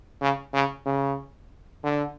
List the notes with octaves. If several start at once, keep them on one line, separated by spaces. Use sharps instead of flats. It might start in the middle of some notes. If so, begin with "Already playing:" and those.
C#3
C#3
C#3
D3